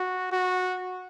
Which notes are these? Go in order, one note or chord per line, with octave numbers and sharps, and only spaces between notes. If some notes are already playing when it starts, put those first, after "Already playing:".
Already playing: F#4
F#4